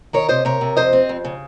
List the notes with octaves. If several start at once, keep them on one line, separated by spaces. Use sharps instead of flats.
D#3 A#4 C#5
C3 C5 D#5
C3 A#4 C#5
C3
F2 C5 D#5
C4
F2
C#3